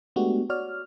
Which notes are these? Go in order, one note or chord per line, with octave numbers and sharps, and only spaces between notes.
G#3 A3 B3 D4 F#4 G4
F#4 C#5 D5 F6